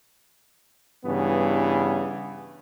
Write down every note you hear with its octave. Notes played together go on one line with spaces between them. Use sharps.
G2 C#3 E3 B3